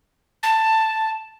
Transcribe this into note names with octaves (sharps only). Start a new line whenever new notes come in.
A5